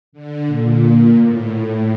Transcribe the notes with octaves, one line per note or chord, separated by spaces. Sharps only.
D3
A#2
A2
A2